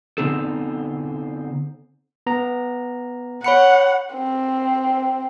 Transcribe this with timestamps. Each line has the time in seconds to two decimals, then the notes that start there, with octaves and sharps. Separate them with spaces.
0.18 D3 B3 C4 D#4 A4
2.27 B3 A#5
3.44 C#5 F#5 B5 C#7
4.15 C4